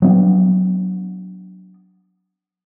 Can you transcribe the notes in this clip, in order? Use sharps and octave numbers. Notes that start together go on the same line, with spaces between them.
F#3 B3 D4